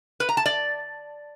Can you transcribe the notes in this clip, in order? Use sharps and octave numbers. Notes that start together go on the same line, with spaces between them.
B4
A#5
A5
D5